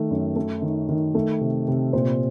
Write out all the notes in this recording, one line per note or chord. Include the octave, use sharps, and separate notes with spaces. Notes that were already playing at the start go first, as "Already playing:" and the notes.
Already playing: D#3 A3
F#2
A3
D#3
D#3
A3
C3
C3
A#2 C5